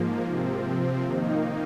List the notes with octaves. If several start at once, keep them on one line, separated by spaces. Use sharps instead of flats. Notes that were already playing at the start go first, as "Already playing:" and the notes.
Already playing: G#2 F3 A#3
C3 F3 C4
D#3 A#3 D#4